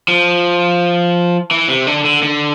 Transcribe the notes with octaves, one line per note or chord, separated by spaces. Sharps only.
F3
E3
C3
D3
D3
D3